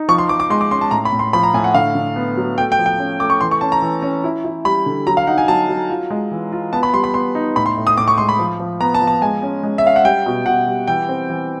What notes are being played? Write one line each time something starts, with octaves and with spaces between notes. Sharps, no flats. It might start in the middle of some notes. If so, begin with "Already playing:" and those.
Already playing: D#4
F3 C#6
C6
F3 D6
D6
G#3 C6
D6
C#4 C6
A5
A2 A#5
B5
A2
C6
F3 B5
A#5
A2 G#5
F#5
D3 F5
D3
B3
F#3
A3 G5
G5
F3
G5
C#4
A3 D6
C#6
E3 C6
C#6
C#4 A5
A#5
E3
C#4
E4
E4
G3 B5
D3
F#3 A#5
F5
D#4 F#5
G#5
F#3 A5
F#3
F4
G#3
E3
F4
B3 A5
B5
G3 C6
B5
B3 C6
D#4
A2 B5
C6
A2
D#6
A2 D6
C#6
G#3 C6
B5
F3
F3
B3 A#5
A5
F3
A5
G#3 G#5
C#4
G#3
E5
C#4 F5
F#5
G3 G5
B2
B2 F#5
G3
E3 G5
C4
E3